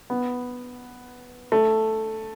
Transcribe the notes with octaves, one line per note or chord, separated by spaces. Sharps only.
B3
A3